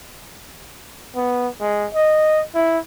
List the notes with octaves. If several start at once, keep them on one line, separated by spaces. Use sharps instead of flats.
B3
G#3
D#5
E4